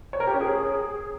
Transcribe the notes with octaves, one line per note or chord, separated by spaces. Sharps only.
C#5
A#4
G4
C#4
G#4